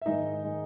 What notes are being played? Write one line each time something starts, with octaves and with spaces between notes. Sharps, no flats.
E5
G#2 D#3 G#3 D#4 D#5
D#3 G#3